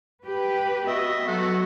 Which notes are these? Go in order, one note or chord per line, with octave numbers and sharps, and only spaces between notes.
G4 B4
B3 F#4 D#5 E5
F#3 A3 B3 F#4 F#5